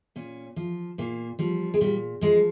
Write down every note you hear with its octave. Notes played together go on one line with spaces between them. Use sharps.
A#2 C#4
F3
A#2 A#3
F3 G3
G#3
A#2 G3
F3 G#3